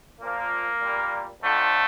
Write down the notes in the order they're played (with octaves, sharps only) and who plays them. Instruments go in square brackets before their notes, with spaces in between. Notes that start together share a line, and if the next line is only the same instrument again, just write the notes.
[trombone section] A#2 F3 A#3
A#2 G3
F2 D3 F3 A3